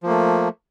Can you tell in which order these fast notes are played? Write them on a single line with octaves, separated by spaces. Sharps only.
F3 A#3 A3